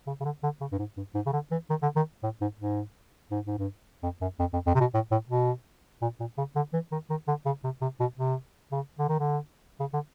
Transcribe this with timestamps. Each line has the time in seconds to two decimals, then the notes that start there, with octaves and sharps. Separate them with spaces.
0.07 C#3
0.21 C#3
0.25 D3
0.43 D3
0.61 C#3
0.72 G2
0.79 G#2
0.97 G2
1.15 G#2
1.26 C#3
1.33 D3
1.51 E3
1.70 D#3
1.83 D3
1.96 D#3
2.23 A2
2.41 G#2
2.59 G#2
3.31 G#2
3.47 G#2
3.59 G2
4.03 F2
4.21 F#2
4.39 F2
4.53 F2
4.67 F2
4.75 C3
4.80 B2
4.94 A2
5.11 A2
5.30 B2
6.02 A#2
6.20 A#2
6.38 C#3
6.56 D3
6.73 E3
6.92 D#3
7.10 D#3
7.28 D3
7.46 C#3
7.64 C3
7.82 C3
8.00 B2
8.18 C3
8.72 C#3
8.99 D3
9.09 D#3
9.20 D3
9.80 C#3
9.94 D3